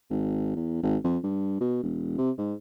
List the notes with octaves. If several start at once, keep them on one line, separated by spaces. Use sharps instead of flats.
G#1
E2
G#1
F2
G2
B2
E1
C3
G#2